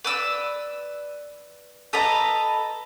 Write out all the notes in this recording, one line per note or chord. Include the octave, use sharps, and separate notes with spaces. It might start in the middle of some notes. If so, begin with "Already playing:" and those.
B4 D5 E6
A4 B4 D#5 A#5